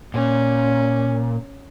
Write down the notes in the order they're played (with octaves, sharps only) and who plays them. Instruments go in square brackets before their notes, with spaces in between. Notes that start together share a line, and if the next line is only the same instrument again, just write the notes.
[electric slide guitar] A#2 [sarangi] C#4